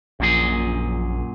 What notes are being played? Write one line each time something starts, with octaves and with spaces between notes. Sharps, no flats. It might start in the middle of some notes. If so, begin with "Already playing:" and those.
A#1 F#2 A#2 G#4